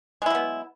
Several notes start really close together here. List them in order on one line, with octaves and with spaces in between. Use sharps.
G#3 E4 F#3 B3